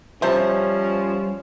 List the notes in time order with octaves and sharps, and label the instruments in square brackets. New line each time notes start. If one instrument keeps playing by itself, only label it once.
[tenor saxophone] F3 [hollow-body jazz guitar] G3 E5 [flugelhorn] C#4 [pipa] C5 A5